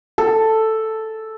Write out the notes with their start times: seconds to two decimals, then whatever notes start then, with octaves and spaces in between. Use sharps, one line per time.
0.18 A4